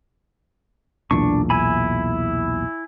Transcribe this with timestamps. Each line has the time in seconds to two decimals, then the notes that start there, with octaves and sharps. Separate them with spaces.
1.11 B1 E2 A#2 D4 C#6
1.50 E4 G#5 B5